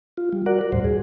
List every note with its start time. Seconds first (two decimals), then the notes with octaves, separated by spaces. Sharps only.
0.17 F4
0.33 G3
0.46 F#4 A#4 D5 F#5
0.61 A#4
0.72 D#2 A2 G3 C5
0.84 G#4